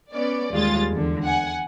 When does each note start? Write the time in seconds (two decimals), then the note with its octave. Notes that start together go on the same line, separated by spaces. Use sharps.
0.12 B3 C#4 D5
0.52 D#2 G3 G#3 F4 A6
0.92 E2 D3
1.25 F#5 G#5